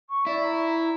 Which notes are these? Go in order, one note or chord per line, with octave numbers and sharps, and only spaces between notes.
C#6
E4 D5
A#5